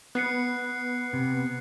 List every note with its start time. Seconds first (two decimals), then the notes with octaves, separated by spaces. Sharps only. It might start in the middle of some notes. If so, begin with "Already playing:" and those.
0.15 B3 F#6 C7 C#7
1.13 C3